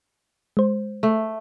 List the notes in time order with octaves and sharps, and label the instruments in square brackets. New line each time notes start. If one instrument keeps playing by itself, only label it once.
[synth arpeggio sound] G#3 C5
[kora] A3